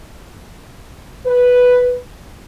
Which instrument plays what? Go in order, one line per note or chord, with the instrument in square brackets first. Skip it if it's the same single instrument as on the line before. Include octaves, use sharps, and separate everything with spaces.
[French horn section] B4